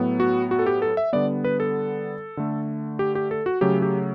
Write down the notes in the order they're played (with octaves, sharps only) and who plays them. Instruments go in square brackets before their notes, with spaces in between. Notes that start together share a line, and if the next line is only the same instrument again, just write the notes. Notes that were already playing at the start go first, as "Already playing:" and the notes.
Already playing: [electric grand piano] A2 F#3 B3
F#4
F#4
A4
G4
A4
E5
D3 G3 B3 D5
B4
A4
D3 A3
G4
G4
A4
F#4
C#3 F#3 A3 G4
G4